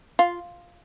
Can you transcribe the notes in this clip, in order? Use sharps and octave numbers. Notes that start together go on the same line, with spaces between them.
F4